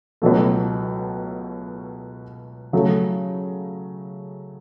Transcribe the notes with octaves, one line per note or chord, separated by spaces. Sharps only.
C#2 B2 F#3 A3
C#3 F#3 A3